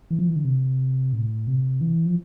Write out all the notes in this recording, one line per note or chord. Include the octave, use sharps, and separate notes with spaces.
E3
F3
E3
D3
C3
A2
C3
E3
F3